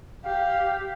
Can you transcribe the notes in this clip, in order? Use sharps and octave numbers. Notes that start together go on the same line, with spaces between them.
G4 F5